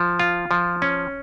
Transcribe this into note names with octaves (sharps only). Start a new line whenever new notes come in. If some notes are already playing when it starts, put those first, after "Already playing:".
Already playing: F3
F4
F3
C#4